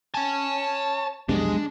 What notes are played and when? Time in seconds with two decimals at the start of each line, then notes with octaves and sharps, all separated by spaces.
0.14 C#5 G#5 A5
1.29 B1 F2 C3 G#3 D4